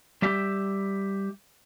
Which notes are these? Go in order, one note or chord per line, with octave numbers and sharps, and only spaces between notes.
G3 G4 E5